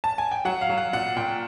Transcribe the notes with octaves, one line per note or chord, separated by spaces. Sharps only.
A5
G#5
G5
F#3 F#5
F5
F#3
F#5
A#2 F#5
A#2 G5